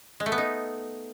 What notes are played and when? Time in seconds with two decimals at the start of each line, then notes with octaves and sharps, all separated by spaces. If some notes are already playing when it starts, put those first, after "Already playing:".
0.20 G#3
0.26 A3
0.32 B3
0.38 D#4